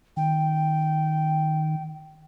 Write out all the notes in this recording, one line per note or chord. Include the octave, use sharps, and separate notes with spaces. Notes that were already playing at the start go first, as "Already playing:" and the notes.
D#3 G5